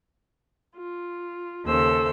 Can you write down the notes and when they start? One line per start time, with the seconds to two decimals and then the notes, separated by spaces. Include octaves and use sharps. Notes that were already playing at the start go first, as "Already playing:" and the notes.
0.75 F4
1.66 D#2 C#3 A4 C5 E6